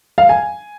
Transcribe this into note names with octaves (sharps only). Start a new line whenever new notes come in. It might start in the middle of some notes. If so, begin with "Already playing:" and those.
F5
G#5